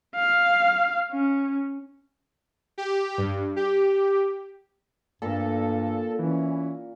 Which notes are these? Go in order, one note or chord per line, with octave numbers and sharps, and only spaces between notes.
F5
C#4
G4
G2
G4
G2 A#2 A4
E3 C#4